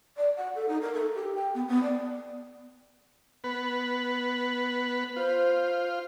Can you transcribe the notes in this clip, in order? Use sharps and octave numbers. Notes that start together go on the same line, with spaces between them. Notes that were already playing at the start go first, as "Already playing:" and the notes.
D5
F#5
A4
D#4
A#4
A4
G4
G5
B3
B3
D5
B3 B4
F4 C5